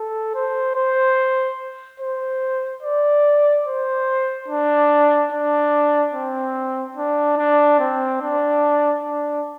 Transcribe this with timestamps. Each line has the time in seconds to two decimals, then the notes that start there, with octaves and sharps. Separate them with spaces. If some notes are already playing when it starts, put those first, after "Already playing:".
Already playing: A4
0.35 C5
0.76 C5
2.00 C5
2.83 D5
3.66 C5
4.48 D4
5.31 D4
6.14 C4
6.97 D4
7.37 D4
7.79 C4
8.21 D4
9.03 D4